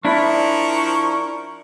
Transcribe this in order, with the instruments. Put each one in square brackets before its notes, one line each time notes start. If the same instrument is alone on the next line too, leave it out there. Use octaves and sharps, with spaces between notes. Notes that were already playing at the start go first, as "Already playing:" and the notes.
[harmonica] F3 A#4 C#6 [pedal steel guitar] D4 E4